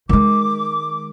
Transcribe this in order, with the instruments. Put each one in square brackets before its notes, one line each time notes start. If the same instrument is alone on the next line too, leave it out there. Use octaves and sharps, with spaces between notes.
[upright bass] D#3 G#3 [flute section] D6